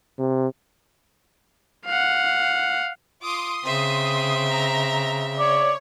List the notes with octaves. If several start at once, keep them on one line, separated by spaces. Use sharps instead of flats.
C3
F5 F#5
F4 C6 D6 D#6
C#3 C4 E5
A#5
C#5 D5